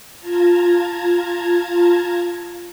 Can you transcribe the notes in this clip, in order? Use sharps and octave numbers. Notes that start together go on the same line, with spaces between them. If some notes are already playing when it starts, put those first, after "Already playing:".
F4 A5 A#5 G#6